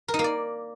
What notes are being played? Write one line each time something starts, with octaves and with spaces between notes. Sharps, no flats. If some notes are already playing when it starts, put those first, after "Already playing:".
A#4
D#4
A#3
D5